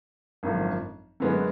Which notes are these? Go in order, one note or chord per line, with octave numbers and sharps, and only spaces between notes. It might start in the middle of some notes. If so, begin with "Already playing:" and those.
G#1 F#2 D3 F3
F#2 D3 G#3 B3